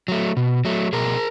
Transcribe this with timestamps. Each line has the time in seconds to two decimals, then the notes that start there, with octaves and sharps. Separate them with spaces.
0.08 F#3 A3
0.37 B2
0.65 F#3 A3
0.93 B2 G#4 A#4